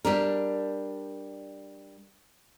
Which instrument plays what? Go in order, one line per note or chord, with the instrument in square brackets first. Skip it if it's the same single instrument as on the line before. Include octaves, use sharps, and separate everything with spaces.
[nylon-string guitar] G3 D4 A#4